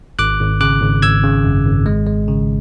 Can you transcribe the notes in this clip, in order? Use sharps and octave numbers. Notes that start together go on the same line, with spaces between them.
G#1 D6 F#6
G#1
C#3 D6 F#6
G#1
G#1 E6 G#6
C#3
F#2
G#1
G#3
G#3
C#3